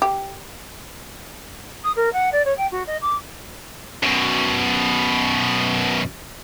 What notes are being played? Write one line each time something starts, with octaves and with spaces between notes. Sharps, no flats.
G4
D#6
A#4
F#5
D5
C#5
G5
F#4
D#5
D6
F#2 B2